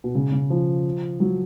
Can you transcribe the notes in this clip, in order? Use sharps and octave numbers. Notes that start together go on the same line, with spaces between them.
B2
C#3
C#3
F3
F#3